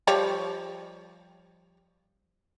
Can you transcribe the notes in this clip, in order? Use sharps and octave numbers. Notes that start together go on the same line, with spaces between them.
F3 G3 C#5